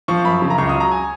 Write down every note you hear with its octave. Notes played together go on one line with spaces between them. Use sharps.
F3 C#6
F#2 B5
C#3
A#5
C#2 C#6
D#6
F#3
A#5
G#5